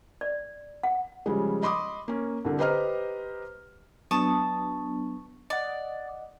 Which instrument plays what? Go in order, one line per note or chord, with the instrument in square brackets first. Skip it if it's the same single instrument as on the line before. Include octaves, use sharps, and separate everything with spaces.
[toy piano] D5
F#5
[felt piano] C#3 F3 G3 G#3
D#5 B5 C6 D6 D#6
A#3 C#4
C2 D3
G4 B4 C5 D#5 A#5 F6
[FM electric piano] F#3 B3 D4 [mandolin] A5 C#6 D#6
[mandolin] D5 [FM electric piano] D#5 F#5